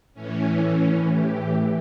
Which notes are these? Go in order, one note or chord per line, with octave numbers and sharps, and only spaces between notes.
A2 E3 C#4
C#4
G4